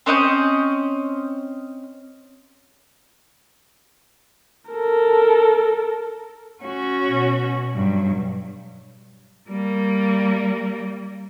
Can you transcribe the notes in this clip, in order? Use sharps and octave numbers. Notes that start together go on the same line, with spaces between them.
C4 C#4 D#5 G6
A4 A#4
C#4 F#4
B2
G2 F#3
G3 A#3